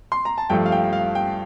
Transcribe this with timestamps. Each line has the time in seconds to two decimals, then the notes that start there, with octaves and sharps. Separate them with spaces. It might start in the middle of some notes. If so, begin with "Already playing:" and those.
0.12 C6
0.25 A#5
0.38 A5
0.50 G2 F3 A3 G5
0.66 F5
0.72 G5
0.93 F5
1.15 G5